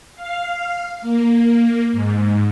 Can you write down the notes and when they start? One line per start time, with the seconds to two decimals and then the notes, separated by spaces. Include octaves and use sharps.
0.15 F5
1.01 A#3
1.92 G#2